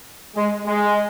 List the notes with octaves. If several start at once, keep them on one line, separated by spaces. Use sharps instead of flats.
G#3
G#3